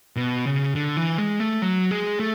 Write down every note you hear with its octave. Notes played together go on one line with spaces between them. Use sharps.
B2
C#3
D3
E3
G#3
A3
F#3
G#3
A3